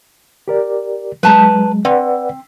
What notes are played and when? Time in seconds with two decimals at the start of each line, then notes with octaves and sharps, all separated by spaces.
0.48 G4 A#4 D5
1.23 F#3 G#3 B4 A5 A#5
1.85 C4 B4 D5 F#5